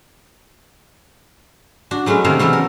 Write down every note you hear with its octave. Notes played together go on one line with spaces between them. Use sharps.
D4 F#4
F#3 G#3 A3 C#4 B4
C3 D#3 F3 A#3 A4 F5
B2 E3 F#3 C#4 E4 A4
A#4